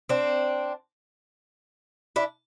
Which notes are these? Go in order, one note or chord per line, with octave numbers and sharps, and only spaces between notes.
C4 D4
D4 E4